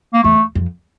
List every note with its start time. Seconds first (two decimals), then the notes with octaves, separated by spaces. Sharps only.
0.14 A#3
0.24 E2 A3
0.55 F2